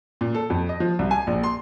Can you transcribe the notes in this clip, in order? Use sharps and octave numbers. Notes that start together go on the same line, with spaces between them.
A#2
A4
F2
D#5
F3
C2
G#5
A#1
C6